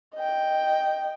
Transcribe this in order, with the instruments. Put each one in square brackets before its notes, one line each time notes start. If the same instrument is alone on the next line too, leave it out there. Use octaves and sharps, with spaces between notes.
[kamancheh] D#5 G5